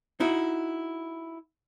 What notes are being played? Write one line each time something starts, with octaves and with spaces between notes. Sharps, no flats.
D#4 E4 F#4